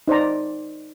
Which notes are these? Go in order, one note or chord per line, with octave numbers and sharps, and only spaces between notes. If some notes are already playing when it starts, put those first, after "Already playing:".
D#4 C5 D5 A#5